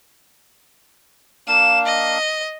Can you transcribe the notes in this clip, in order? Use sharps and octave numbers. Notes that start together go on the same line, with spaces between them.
A#3 D4 F5 E7
D#5